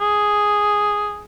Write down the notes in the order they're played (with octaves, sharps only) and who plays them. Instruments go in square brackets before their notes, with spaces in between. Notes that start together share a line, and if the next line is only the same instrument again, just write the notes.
[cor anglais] G#4